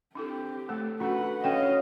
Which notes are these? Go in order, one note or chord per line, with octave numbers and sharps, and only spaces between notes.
C4 D4 E4 G4 A4
A3 A4
C#4 D4 F#4 A4 B4 F#5
C#4 D4 A4 D#5 F5 G5